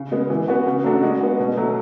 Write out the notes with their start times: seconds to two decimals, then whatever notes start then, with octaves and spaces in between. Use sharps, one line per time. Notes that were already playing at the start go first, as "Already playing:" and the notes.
Already playing: C#3
0.12 G#3 B3
0.30 E3
0.48 B3 F#4
0.66 C#3
0.84 F#3 A3 D4 F#4
1.03 G#3
1.21 B3 F#4
1.39 B2
1.57 F#3 A3